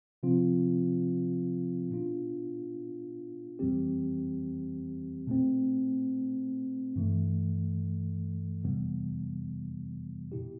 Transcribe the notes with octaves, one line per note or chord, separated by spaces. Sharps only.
C3 F3 C4 F4
B2 B3 D4 F4
F2 E3 G3 C4 G4
B2 A3 C4
G2 E3 A3
F2 C3 E3 G3 B3
B2 B3 E4 G4